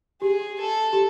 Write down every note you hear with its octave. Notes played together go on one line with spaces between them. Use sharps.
G4 G#4
A4
G4